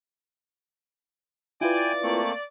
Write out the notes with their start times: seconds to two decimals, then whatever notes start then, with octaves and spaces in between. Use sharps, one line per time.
1.61 E4 F4 B4 D5 G5 G#5
2.03 A3 A#3 C4 C#6